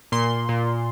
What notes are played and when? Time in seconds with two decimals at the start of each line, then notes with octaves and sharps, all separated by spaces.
0.12 A#2 C6
0.49 A#2